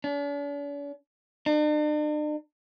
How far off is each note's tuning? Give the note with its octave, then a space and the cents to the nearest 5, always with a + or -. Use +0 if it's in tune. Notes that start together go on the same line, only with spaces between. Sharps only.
D4 -45
D4 +45